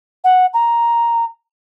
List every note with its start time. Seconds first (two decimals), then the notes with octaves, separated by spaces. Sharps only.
0.24 F#5
0.54 A#5